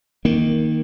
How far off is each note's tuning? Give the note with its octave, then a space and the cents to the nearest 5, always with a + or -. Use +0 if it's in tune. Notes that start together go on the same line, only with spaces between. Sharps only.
D#3 +10 A#3 +0